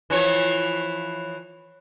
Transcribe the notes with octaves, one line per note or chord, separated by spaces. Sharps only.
E3 F3 C#5